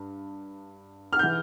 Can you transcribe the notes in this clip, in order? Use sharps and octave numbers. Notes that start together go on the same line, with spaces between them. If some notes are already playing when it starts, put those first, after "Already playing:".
Already playing: G2
F6
E3 G6